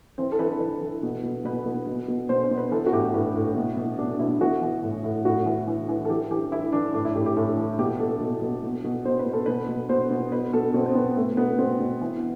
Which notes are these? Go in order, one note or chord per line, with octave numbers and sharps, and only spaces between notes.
E3 C4
A4
E3 B4
E3 B4
E3 A4
B2
B2
B2 B4
B2
B2
B2
B2 C5
C5
B2
B4
E3 A4
F#4
A2 G4
A2 B4
A2
B2
B2
B2 D4
B2 E4
E3 F#4
E3
A2
A2
A2 F#4
E3
E3
E3
A4
E3 G4
E3 G4
E3 E4
E3 D4
A2 D4
E4
A2 G4
G4
A2 A4
E3
B2 G4
B2 A4
B2
B2
B2
B2
B2 C5
B4
B2
A4
B2 B4
B2
B2 C5
B2
B2 B4
B2 A4
B2 C4
C4
B2 B3
B2 A3
B2 B3
B2 C4
B2
E3